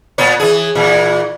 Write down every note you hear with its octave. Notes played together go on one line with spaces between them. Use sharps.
A#2 B3 C#5
E3 G#4
A#2 E3